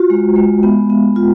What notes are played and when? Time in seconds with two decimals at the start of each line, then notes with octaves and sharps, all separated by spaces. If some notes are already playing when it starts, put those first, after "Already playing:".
Already playing: F4 F#4
0.10 G#3
0.36 G#3
0.63 B3
0.90 B3
1.16 F4